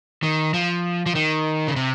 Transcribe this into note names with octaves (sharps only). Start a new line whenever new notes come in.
D#3
F3
F3
D#3
C#3
C3